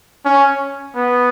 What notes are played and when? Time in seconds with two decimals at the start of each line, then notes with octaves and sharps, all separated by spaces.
0.25 C#4
0.96 B3